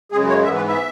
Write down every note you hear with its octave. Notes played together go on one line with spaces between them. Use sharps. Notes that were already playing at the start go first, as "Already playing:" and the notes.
F#2 C#3 G#3 G#4
C#5
G#2 E3 B3 E5
B4
E5